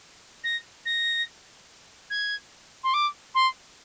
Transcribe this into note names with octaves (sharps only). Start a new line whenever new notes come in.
A#6
A#6
G#6
C6
D6
C6